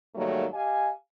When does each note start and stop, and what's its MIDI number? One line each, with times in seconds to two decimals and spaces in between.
0.15 0.45 44
0.15 0.45 51
0.15 0.45 54
0.15 0.45 55
0.15 0.45 57
0.15 0.45 58
0.53 0.91 67
0.53 0.91 75
0.53 0.91 77
0.53 0.91 80